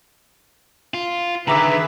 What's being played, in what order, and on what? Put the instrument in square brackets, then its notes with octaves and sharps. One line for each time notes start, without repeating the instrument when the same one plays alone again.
[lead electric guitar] F4
[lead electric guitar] D3 D#3 [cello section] G#4 B4 E5 [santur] A#5 D6 E6